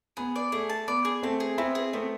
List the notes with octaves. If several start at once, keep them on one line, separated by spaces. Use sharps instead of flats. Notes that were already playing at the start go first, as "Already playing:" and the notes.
B3 G#4
D5
A3 G#4
A5
B3 D5
G#4
A3 C4 A5
G#4
B3 C4 E4
G#4
A3 B3 C4